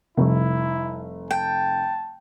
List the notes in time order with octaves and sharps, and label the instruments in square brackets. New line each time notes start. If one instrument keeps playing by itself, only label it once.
[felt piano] F1 [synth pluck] C3 F3 G3 [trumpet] E4
[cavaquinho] G5 [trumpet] A5